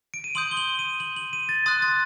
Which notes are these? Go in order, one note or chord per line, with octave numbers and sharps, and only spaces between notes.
D7
D#7
C6 D#6 G6 F#7
G7
F#7
D#7
F#7
F#7
D#7
A6
C6 D#6 F#6 A6
A6